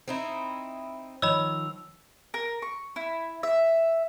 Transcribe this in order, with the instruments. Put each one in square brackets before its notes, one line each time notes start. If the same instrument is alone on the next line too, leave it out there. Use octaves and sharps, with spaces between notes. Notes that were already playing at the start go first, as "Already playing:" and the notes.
[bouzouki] C4 D#4 E4
[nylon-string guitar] D#3 F3 [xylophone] C#5 D#5 B5 [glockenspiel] E6 F7
[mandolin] A#4
C#6
E4
E5